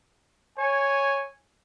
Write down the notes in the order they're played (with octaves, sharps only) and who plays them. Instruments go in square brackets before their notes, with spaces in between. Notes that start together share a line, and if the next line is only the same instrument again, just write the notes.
[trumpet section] C#5 G#5